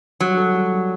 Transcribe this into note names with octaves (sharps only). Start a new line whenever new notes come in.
F#3 G3
A4
G3
G3